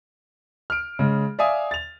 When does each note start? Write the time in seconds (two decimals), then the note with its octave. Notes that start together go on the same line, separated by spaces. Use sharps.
0.70 F6 D7
0.99 C#3 G#3
1.39 D5 E5 F5 G#5 D#6
1.71 A6 F7